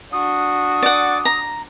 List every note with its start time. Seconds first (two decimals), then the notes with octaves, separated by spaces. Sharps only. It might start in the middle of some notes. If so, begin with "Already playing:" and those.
0.13 D4 F#4 D#6
0.83 D5 F#5
1.25 A#5